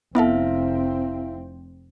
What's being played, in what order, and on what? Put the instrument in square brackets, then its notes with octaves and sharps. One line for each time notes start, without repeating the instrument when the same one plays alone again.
[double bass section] F1 C4 [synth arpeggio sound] B3 A4 [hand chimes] E4 E5 F5